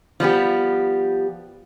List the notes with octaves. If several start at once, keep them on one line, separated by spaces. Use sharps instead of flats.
F3 G3 B3 G4